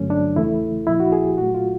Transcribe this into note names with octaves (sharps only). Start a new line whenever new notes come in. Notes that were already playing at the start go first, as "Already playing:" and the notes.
Already playing: G2 D3 F#3 A3 C#4
D4
E2 C#3 E3 A3 E4
A#2 F3 A#3 E4
F#4
G#4
G4
A#2 F#3 A3 F#4
F4